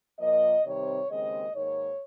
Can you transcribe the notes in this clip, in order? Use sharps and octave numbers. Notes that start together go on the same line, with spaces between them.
A#2 F3 A#3 D#5
C3 D#3 G3 C4 C#5
D#2 C#3 G#3 C4 D#5
G#2 D#3 A#3 C#5